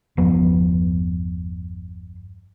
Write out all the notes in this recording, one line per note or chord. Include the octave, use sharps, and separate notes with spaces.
G1 E2 F3 B3